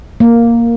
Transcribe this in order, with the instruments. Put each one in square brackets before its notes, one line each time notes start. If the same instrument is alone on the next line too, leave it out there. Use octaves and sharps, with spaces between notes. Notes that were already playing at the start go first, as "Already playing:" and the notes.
[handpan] A#3